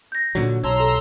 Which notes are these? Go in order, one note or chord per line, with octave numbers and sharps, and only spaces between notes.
G6 A#6
A#2 D3 F#3
B1 C#5 A5 A#5 C6 E6
G4 A4